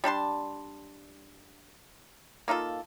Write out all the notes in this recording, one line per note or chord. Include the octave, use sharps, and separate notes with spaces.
G3 D4 A5 C6
A#3 D#4 F4 A4